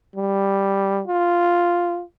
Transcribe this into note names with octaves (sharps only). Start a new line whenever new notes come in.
G3
F4